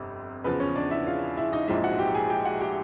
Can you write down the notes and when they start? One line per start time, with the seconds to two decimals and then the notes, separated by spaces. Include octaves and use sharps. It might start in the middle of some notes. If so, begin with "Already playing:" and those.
Already playing: G1 F2 C3
0.44 E2 C#3 F3 B3 B4
0.60 C#4 C#5
0.75 D4 D5
0.91 E4 E5
1.07 F4 F5
1.37 E4 E5
1.53 D#4 D#5
1.68 A#1 G#2 F3 G#3 E4 E5
1.84 F#4 F#5
1.99 G4 G5
2.15 G#4 G#5
2.30 G4 G5
2.45 F#4 F#5
2.60 G4 G5